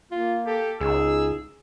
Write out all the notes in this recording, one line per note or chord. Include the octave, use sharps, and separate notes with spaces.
A#3 F4
G4 A4
C#2 D#4 G#4 E6